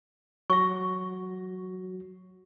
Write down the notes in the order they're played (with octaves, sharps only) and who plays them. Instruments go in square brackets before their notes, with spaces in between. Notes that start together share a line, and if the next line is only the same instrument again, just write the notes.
[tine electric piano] F#3 F#4 A#6 [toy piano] C#6